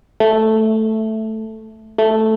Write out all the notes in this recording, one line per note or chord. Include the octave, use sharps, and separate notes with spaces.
A3
A3